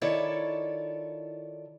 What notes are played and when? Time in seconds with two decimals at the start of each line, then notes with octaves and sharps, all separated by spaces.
0.02 D#3 E4 F4 A4 C#5 D5